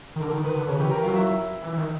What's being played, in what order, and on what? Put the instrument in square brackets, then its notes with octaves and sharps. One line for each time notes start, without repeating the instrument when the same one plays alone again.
[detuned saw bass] D#3
[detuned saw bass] D3 [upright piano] A#4
[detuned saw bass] D#3
[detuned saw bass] D#3 [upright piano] B4
[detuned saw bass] D3
[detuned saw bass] C#3 [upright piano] C#4 C#5
[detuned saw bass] E3 [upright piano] G4 G5
[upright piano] A#4 A#5
[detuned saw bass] F#3 [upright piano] F4 F5
[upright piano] E4 E5
[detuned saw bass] E3
E3
D#3